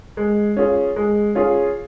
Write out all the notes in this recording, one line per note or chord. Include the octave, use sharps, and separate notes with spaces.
G#3
C#4 F4 G#4
G#3
C#4 F4 G#4